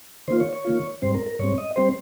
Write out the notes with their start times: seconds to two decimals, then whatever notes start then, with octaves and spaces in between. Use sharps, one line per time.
0.28 D#3 A#3 F4 C5
0.40 C#5
0.53 C#5
0.65 D#3 A#3 F4
1.02 G#2 G3 C4 C5
1.14 A#4
1.26 A#4
1.39 G#2 G3 C4 C#5
1.58 D#5
1.76 G3 C4 C5